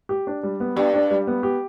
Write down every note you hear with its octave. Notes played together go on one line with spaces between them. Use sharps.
G4
D4
G3
B3
G2 G4
D4
G3
B3
G4